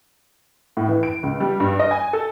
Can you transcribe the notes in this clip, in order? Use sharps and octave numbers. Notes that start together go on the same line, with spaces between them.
A2
E3
D7
C#2
G3
G2
D#5
G#5
A4